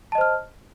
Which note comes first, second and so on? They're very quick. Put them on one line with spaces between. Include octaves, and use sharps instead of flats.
A5 D#5 C5 F6